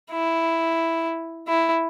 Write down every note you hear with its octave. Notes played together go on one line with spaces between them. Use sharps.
E4
E4